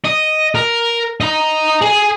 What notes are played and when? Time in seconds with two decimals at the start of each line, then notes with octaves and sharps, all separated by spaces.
0.05 D#5
0.55 A#4
1.21 D#5 A#5
1.81 G#4 G#5